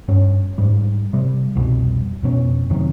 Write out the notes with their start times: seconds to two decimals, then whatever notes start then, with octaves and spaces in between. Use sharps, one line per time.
0.08 G2 C#4
0.58 G#2 G3
1.13 C3 G3
1.55 C2 F2 B2 G3
2.23 F2 B2 C#4
2.70 F2 C3 D#3 F#3